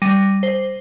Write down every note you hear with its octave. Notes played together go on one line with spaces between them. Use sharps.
G3 A#6 D#7
C5